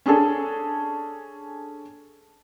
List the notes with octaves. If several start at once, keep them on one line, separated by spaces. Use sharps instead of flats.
C#4 D4 G#4 A4